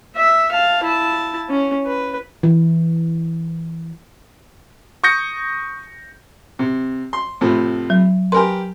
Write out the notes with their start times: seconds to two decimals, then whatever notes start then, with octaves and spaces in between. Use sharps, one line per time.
0.16 E5
0.52 F5 A5
0.83 E4 A5
1.49 C#4
1.86 B4
2.43 E3
5.04 C#6 D#6 G6 A#6 C#7
6.59 C3
7.13 C6
7.41 A2 C3 F3
7.90 F#3
8.32 G4 A#4 B4 G#5 C6